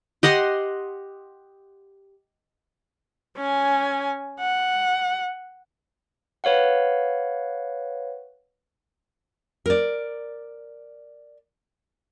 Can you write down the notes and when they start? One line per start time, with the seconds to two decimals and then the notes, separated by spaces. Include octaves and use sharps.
0.23 G4 D#5 F#5 C6
3.37 C#4 G#5
4.40 F#5
6.44 B4 C#5 F5 F#5
9.66 A#4 D5